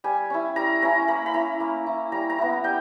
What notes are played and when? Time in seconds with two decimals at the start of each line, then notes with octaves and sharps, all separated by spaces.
0.04 G3 G#5
0.30 C#4 E4
0.56 G3 A#5
0.82 C#4 E4 A#5
1.08 A#3 B5
1.26 B5
1.34 E4 A#5
1.60 A#3
1.86 E4
2.12 G3 A#5
2.30 A#5
2.38 B3 E4
2.64 G3 G5